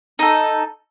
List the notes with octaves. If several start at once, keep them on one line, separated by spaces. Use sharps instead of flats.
D#4 A4